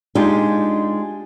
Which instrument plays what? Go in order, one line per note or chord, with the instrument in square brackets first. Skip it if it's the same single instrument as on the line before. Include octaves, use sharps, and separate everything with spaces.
[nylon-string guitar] G#3 D4 D#4 F4 G4